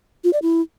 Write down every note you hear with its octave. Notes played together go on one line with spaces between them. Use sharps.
F4
D5
E4